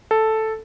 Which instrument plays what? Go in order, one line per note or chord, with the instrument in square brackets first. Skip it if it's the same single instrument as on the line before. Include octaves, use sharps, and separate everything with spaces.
[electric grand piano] A4